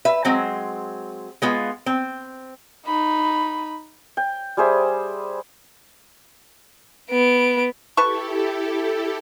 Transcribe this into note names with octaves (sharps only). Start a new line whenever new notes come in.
B4 E5
F#3 G#3 C4
G#3 B3 F4
C4
D#4 B5
G5
G3 G#4 C5 E5
B3 D7
E4 G4 A4 B4 A5 C#6